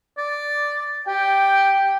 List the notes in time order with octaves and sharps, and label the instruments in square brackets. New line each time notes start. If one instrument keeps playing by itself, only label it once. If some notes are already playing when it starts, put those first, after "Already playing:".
[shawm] D5
[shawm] G4 [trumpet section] G5